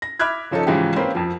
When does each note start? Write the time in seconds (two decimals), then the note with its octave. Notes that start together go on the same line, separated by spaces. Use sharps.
0.02 A#6
0.19 E5 B5 D6 F6 F#6 G#6
0.51 C#3 F3 C#4 D#4 A4
0.67 G#2 C#3 E3 F3 G#3 G4
0.96 A#3 C4 C#4 B4 C5
1.15 F2 F3